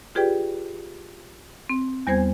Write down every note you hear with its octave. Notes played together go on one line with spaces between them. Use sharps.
F4 G4 G#4 B4 D5 G5
C4
E2 G3 B3 C5 G#5 G#6